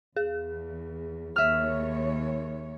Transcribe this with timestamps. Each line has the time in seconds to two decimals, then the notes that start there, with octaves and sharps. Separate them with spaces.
0.16 E2 G#4
1.36 D#2 D#3 C#5 E5 F6